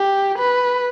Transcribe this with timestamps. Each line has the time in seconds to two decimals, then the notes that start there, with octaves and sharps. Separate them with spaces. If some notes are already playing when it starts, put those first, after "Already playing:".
Already playing: G4
0.37 B4